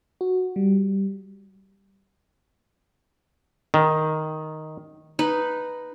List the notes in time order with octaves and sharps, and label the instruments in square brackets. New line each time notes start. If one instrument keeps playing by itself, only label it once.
[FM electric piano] F#4
G3
[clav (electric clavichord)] D#3
[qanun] D#4 B4